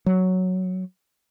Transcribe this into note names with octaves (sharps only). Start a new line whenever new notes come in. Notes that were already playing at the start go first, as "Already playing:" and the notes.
F#3